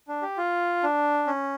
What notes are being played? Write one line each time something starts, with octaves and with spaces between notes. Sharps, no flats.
D4
G4
F4
D4
C#4